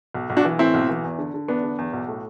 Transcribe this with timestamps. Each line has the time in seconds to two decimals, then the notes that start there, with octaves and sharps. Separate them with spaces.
0.14 B1
0.30 B1
0.37 D4 F#4
0.45 E3
0.59 A2 C4 E4
0.74 B1
0.89 E3
1.04 E2
1.19 D3
1.34 D3
1.48 E2 B3 D4
1.63 D3
1.78 E2
1.93 B1
2.09 A2